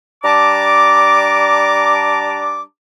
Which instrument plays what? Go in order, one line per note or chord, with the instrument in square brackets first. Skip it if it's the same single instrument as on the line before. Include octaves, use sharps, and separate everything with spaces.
[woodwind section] G3 D4 A5 A#5 D6